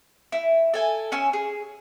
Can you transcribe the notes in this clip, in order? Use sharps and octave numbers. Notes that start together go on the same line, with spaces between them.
E4
A4 G#5
C#4 C#5 G#5 E6
G#4